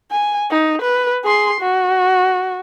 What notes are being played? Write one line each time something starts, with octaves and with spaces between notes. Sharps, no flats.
G#5
D#4
B4
G#4 C6
F#4